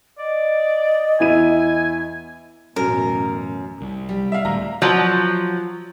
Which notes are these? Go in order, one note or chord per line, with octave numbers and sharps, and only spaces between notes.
D5 D#5
E2 E4 G#5 D#7
A1 F#2 B2 A#4
C2
G3
E5 F5
D1 A#5
F3 F#3